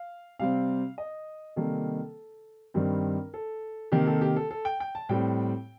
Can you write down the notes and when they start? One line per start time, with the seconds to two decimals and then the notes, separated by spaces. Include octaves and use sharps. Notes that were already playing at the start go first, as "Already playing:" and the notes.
Already playing: F5
0.39 C3 G3 C4 F5
0.98 D#5
1.56 C3 D#3 G3 A#3 A4
2.74 G2 D#3 G3 C4 A#4
3.34 A4
3.92 C3 D#3 A#3 G4
4.07 A4
4.21 G4
4.36 A4
4.51 A4
4.65 G5
4.80 G5
4.95 A5
5.09 A2 G3 C4 G5